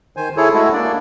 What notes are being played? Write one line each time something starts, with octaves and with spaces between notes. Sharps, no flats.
D#3 C5 G#5
E4 G#4 A4 C#5
G#3 A3 E4 F#4 A4
A#3 D4 D5